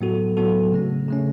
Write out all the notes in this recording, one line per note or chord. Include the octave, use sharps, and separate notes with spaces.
A2 F#3 B3 F#4 A4
A2 F#3 B3 F#4 A4
C#3 A3 C#4
C#3 A3 C#4